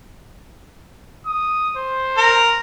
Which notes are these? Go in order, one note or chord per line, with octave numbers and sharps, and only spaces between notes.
D#6
C5
A#4